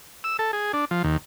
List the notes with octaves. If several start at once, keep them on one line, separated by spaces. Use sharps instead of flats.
E6
A4
G#4
D4
F3
D#2